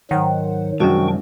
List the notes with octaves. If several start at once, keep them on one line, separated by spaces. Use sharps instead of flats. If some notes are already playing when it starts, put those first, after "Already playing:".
G#2 D#3 F#3 C5 F#5
C2 F#2 G#3 D4 F#4 G5 C#6